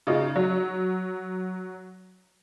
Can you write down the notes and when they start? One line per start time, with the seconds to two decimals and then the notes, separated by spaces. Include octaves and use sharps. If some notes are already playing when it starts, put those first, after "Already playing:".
0.07 C#3 D#4 F4
0.36 F#3